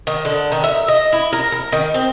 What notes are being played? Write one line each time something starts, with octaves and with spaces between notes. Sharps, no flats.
D#3
D3
D#3
E5
D#5
E4
A#4
A#4
D#3
C4